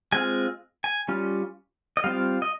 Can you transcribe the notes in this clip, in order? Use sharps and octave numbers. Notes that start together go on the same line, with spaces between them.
G#3 C4 F4 G#5
G#5
G3 C#4 F4
D#5
G3 C4 F4 F5
D#5